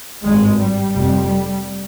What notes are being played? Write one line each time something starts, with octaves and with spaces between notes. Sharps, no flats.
G#1 G2 G#3
G3
F1 F2 C3